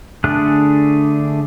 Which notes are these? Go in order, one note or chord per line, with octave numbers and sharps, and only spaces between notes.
D3 A3 D4 G#4 F#6